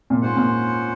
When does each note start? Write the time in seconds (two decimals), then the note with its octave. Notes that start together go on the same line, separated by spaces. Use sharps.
0.10 A#2
0.21 G#2 C#4 F4 C5 F#5
0.36 A#2